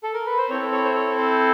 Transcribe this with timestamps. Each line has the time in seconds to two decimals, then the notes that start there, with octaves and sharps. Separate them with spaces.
0.03 A4
0.14 A#4
0.26 B4
0.38 C5
0.50 C4 E4 A4 C#5
0.72 C#5
0.85 C5
0.95 C#5
1.18 C5